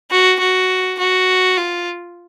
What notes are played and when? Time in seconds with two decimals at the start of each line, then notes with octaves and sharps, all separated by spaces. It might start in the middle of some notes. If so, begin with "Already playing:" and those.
0.11 F#4
0.40 F#4
0.99 F#4
1.58 F4